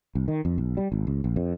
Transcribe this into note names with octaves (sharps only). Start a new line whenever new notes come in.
C2
D#3
F2
B1
G3
G#1
C#2
A#1
F2